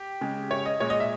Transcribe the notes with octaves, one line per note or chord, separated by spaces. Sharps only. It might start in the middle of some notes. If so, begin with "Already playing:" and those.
Already playing: G4
C#3 G#3
C#5
D#5
A#2 G#3 C#5
D#5
E5